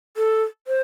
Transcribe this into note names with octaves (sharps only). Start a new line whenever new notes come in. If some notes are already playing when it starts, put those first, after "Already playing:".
A4
C5